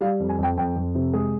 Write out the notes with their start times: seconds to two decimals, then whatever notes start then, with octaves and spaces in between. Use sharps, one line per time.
0.01 G3 F5
0.20 F2
0.29 G#5
0.38 F2 G5
0.57 F2 G5
0.76 F2
0.95 C3
1.13 G#3 G#4